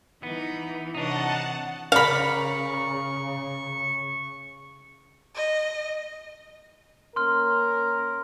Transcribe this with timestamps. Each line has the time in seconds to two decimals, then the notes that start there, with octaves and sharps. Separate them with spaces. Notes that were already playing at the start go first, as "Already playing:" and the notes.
0.23 E3 B3 D#4
0.94 C3 D4 D#4 C#5 D#5 F#5 A5
1.92 C#3 A#4 D5 F5 A#5 B5 C#6
5.35 D#5
7.16 A#3 C#4 A#4 C6 F6